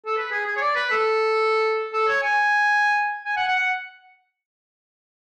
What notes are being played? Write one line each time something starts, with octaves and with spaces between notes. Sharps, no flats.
A4
B4
G#4
G#4
C#5
D5
B4
A4
A4
C#5
G#5
G#5
F#5
F#5
F#5